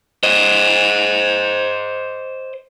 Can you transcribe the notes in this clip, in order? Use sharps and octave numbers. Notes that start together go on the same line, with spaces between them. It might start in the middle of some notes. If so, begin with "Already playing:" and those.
C5 D#5